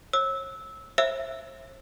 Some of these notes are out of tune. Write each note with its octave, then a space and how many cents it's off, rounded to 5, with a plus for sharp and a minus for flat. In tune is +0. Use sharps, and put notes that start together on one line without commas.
C#5 -40 E6 -15
C5 +45 E5 +0 E6 +5